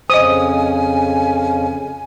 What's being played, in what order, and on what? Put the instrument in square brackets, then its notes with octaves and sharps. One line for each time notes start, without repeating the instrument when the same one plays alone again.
[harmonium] F2 C#3 [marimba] C5 D#5 [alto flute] G#5 [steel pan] D#6